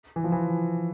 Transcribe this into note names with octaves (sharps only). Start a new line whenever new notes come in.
E3
F3
E3